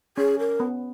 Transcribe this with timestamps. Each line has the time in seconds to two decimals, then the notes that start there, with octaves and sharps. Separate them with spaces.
0.17 C#4 G#4
0.39 A#4
0.60 B3